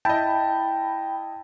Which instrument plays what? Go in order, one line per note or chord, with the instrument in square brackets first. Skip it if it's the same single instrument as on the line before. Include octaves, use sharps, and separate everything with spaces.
[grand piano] E4 D#5 [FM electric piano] G5 B5 [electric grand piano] A5